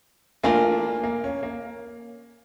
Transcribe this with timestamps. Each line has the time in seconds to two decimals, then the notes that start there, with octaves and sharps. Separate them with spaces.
0.43 E3 A3 A#3 D4 F4 A#4
1.04 A#3
1.24 C#4
1.43 A#3